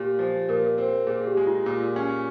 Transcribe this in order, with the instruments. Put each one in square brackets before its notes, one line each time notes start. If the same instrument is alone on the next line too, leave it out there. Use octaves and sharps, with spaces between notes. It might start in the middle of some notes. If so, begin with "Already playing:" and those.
Already playing: [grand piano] A#2 [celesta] G4
[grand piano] F3
[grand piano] A#2 [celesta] A#4
[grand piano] C4
[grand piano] A#2 [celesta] G#4
[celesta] G4
[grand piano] G#3
[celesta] F4
[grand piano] A#2 [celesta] F4
[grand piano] C#4